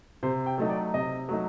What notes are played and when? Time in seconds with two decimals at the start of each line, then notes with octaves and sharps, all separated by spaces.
0.23 C3 C5
0.46 G5
0.58 F#3 A3 D#4
0.69 D5
0.94 C3 D#5
1.29 F#3 A3 D#4